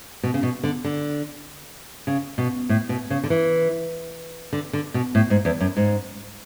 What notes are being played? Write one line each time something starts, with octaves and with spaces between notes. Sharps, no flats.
B2
C#3
B2
D3
D3
C#3
B2
A2
B2
C#3
D3
E3
D3
D3
B2
A2
G#2
E2
F#2
G#2